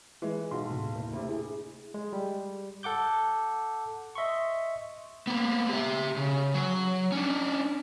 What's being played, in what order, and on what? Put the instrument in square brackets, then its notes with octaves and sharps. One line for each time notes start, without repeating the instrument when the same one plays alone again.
[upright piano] E3 G#3
[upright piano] B1 [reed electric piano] F#4 C6
[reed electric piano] D#2 A2 C3
[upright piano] F#1
D2 C3
[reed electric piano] E4 G#4
[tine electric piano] G#3
G3
A4 F#5 D6 G6
D#5 E5 C6 C#6
[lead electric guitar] A#3 B3
G4 E5
C#3
F#3
C#4 D4